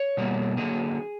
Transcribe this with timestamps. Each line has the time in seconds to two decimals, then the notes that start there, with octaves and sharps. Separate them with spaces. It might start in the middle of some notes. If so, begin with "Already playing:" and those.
Already playing: C#5
0.17 B2 G3 A#3
0.57 D3 F#3 A#3 G#4